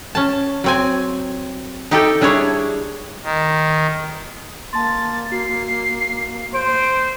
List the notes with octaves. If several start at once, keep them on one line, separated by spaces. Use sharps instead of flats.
C#4 A5
F#3 C4 G#5
D#4 G4 A4 G5
G3 D4 E4 G#4 C#5
D#3
A#3 A5 C6 A6
F#4 C7
C5 D7